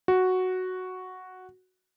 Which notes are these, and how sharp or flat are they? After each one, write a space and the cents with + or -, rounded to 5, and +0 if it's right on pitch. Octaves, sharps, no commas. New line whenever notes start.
F#4 +0